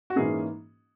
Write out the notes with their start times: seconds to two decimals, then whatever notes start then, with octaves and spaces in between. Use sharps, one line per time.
0.10 F#4
0.16 G#2 E3 A#3 C#4 G#4